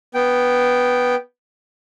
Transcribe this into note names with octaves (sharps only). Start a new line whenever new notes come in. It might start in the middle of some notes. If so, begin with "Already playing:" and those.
B3 G5